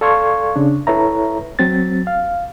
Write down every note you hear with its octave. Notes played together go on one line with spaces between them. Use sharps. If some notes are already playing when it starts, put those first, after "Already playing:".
A4 D5 F5 C6 C#6 G#6
C#3 D4
E4 A4 B4 C#5 E5 A#5
F#3 C4 A6
F5